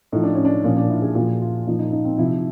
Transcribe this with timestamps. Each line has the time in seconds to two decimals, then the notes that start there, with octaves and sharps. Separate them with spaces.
0.12 A2 F3 D#4
0.23 D4
0.35 C#4
0.45 D4
0.64 A#2 F3 C#4
0.77 D4
0.90 E4
1.02 G#4
1.15 A#2 F#4
1.18 F3
1.41 F4
1.66 A#2 F3 D#4
1.79 D#4
1.92 D#4
2.05 C4
2.18 C3 F3 E4